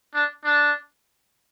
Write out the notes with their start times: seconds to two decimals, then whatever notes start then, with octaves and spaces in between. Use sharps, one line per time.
0.14 D4
0.44 D4